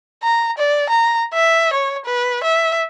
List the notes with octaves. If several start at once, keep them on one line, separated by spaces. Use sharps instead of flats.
A#5
D5
A#5
E5
C#5
B4
E5